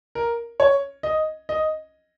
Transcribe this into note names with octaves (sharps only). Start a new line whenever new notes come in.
A#4
C#5
D#5
D#5